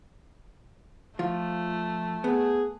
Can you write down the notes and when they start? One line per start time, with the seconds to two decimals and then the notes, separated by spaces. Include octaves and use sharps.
1.19 F3 A3 F4
2.24 B3 G#4